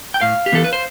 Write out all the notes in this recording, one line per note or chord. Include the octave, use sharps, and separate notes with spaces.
G5
A2 F5
G4
E3 B3 A4
B4
C5